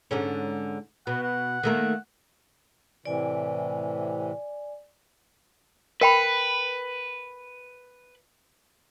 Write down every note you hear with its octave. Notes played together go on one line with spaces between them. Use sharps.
G#2 D3 C#4
B2 F#5
F#5
D#3 A3 A#3
A2 C3 E3 D5 G#5
A#4 B4 G5 B5